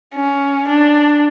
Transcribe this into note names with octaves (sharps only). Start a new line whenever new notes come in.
C#4
D4